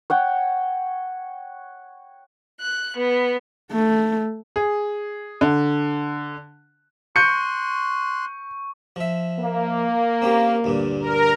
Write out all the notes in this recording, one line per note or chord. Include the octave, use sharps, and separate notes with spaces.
C#5 F#5 G5
F#6
B3
A3
G#4
D3
C6 C#6 F#6 G6 C#7
F3 E5
A#3
C4 C#4 G4
D2 G2 A#2
A#4